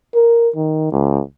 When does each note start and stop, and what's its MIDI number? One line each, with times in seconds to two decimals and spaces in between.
0.15 0.49 70
0.56 0.91 51
0.92 1.20 37